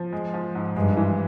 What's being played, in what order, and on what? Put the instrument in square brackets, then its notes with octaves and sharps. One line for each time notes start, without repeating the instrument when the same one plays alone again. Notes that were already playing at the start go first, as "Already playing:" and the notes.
Already playing: [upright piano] F3
G#3
F3
G#2
[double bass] G2 [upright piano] G#3
[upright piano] E3